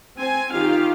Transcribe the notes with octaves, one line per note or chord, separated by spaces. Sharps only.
C4 G#5
D#3 F4 G4 F5